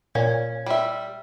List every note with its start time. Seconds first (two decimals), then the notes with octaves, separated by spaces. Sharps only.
0.15 A#2 C#4
0.66 G3 E5